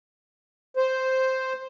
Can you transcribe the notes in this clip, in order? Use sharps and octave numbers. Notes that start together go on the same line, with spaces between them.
C5